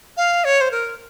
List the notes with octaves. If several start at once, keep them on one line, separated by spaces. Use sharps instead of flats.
F5
C#5
C5
A#4